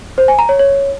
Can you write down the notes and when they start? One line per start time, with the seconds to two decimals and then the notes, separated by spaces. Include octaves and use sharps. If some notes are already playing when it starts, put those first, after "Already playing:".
0.18 C5
0.28 G#5
0.39 A#5
0.49 C#5
0.59 C#5